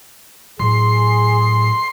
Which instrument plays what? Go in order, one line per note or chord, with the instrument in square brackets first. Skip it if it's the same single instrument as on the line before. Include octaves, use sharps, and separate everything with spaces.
[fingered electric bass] A2 F#3 [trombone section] G#4 [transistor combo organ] C6